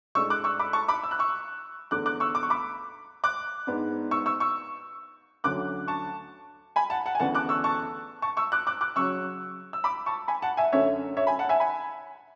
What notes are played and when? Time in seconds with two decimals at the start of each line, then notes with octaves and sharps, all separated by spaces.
0.15 A2 G#3 D4 C#6 E6
0.30 D6 F#6
0.44 C#6 E6
0.59 B5 D6
0.73 A5 C#6
0.88 B5 D6
1.03 E6
1.11 F#6
1.19 C#6 E6
1.91 E2 D3 A3 D6 F#6
2.06 D6 F#6
2.20 C#6 E6
2.35 D6
2.43 C#6
2.50 B5 D6
3.24 D6 F#6
3.67 G#2 G#3 B3 D4
4.11 C#6 E6
4.26 C#6 E6
4.40 C#6 E6
5.44 D2 D3 F#3 C#4 D6 F#6
5.88 A5 C#6
6.76 G#5 B5
6.90 F#5 A5
7.06 F#5 A5
7.15 G#5
7.20 D2 C#3 E3 B3 D4 F#5 A5
7.35 D6 F#6
7.49 C#6 E6
7.64 A5 C#6
8.22 A5 C#6
8.37 C#6 E6
8.52 D6 F#6
8.67 D6 F#6
8.81 D6 F#6
8.96 C#3 F#3 C#4 C#6 E6
9.73 E6
9.84 B5 D6
10.06 A5 C#6
10.28 G#5 B5
10.42 F#5 A5
10.57 E5 G#5
10.72 F#2 D3 A3 C#5 E5
11.17 C#5 E5
11.27 G#5 B5
11.39 F#5 A5
11.49 E5 G#5
11.60 G#5 B5